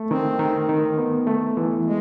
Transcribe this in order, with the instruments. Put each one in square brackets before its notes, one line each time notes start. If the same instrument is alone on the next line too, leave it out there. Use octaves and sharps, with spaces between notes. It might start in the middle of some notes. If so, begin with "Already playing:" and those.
Already playing: [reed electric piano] A3
[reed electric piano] D#3 [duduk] C4
[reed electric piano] D#3
D#3
B3
A3
E3
[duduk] G#3